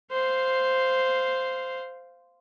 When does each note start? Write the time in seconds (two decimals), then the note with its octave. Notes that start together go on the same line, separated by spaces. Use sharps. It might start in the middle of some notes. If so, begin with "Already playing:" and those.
0.11 C5 F5